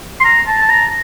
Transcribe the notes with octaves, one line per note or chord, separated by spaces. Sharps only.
C6
A#5
A5
A5
A#5